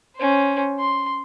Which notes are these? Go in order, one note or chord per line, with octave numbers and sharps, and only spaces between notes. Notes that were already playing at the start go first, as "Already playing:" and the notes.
C#4 C5
C6